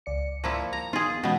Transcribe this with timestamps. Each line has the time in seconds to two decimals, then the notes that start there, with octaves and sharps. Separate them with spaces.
0.06 C#2 D5 C#7
0.44 F3 A#3 E4
0.73 A#5
0.93 B3 D#4 F4 G#4
1.23 B2 E3 G#3 B3 C#4